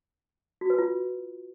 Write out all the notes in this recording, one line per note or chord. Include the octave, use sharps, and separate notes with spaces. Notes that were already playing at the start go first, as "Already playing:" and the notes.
F#4
B4
F4